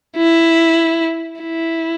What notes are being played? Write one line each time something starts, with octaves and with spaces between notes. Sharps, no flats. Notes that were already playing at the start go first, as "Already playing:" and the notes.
E4
E4